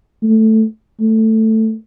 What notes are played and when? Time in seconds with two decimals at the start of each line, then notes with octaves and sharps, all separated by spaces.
0.23 A3
1.01 A3